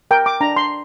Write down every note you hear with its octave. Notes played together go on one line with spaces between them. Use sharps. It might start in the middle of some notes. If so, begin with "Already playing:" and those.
A#4 G5
D6
D4 A#5
C6